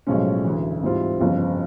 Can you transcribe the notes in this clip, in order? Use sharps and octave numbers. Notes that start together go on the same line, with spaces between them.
B1 A2 F3 G#3 C#4
D2 C#3 E3
G#2 E3 G3 C4 F4
G1 F2 C#3 F3